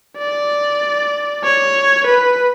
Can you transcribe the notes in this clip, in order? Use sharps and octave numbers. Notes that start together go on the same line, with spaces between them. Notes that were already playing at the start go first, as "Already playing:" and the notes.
D5
C#5
B4